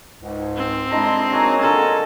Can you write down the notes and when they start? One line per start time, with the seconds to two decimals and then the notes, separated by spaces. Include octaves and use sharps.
0.21 C#2 G#2
0.57 C4
0.91 G#3 D4 E4 G#4 A#5
1.32 F#3 A#3 D#4 C#5 G#5 A#5
1.62 D3 F4 G#4 A4